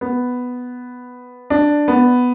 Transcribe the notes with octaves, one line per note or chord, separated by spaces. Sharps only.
B3
D4
B3